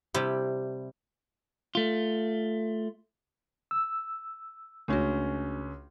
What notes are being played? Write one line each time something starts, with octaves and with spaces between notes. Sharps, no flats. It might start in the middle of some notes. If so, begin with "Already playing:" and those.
C3 G3 E4 G4
A3 F4
E6
C#2 A3 C#4 D4 F#4